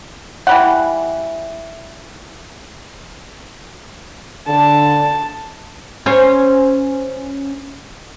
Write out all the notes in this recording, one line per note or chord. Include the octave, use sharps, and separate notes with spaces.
E3 G3 F#5
D3 A5
C#4 C5 C#5